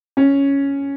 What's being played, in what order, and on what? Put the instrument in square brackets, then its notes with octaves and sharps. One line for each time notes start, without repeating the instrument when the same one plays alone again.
[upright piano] C#4